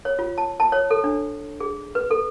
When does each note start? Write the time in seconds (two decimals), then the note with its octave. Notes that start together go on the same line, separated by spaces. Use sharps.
0.05 C#5
0.19 F4
0.38 A5
0.60 A5
0.72 C#5
0.90 A4
1.04 D4
1.60 G#4
1.95 B4
2.11 A4